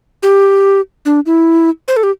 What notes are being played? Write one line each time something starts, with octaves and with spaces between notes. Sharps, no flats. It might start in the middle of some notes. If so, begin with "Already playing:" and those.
G4
D4
E4
C5
A4
G4